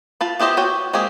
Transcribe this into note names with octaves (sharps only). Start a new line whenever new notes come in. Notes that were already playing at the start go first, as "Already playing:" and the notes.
F4 A5 B5
B3 E4 G4 C5 D#5
F#4 B4 C#5 G5
G#3 A#3 C4 G4 G#4